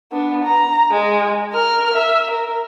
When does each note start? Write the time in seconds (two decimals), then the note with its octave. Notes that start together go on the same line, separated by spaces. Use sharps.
0.12 B3 D4
0.44 A#5
0.91 G#3
1.53 A#4 F6
1.94 E5
2.31 A#4